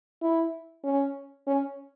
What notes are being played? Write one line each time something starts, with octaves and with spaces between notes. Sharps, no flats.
E4
C#4
C#4